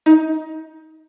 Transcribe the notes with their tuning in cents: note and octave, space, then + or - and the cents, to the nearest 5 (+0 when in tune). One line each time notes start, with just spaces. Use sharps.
D#4 +25